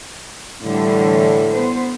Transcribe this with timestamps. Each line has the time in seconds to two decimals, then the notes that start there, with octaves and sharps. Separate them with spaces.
0.63 A2 D3 E3 G3
1.52 B3 C5